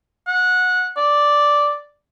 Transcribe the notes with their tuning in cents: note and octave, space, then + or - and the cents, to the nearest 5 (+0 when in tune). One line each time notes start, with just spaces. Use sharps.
F#5 -20
D5 -5